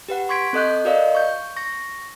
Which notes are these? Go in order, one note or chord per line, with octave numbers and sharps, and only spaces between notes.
G4 B4 F#5
C6 C#6 G#6 B6 D7
C4 A4 D#5 F#6 G6
F#4 A#4 C5 D5 D#5 F5
C#6 G6
C#6 A#6